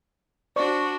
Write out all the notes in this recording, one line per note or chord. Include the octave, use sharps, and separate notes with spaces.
D4 F#4 C5 D5 C#6